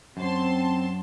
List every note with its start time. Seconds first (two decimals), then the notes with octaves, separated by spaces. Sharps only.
0.17 F#2 C4 A5 C6